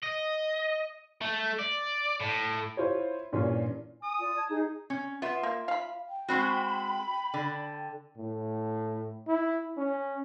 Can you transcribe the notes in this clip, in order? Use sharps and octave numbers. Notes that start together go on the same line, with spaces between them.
D#5
A3
D5
A2
E4 F4 C5 C#5
G2 A#2 E3 C#4 F4
G#5 D#6
F4 D5
A5 G#6
D#4 G#4
C#4
B3 F4 E5
A#3
F5 B5
G5
G#3 C4 F#4 B5
D3 G5
A2
E4
C#4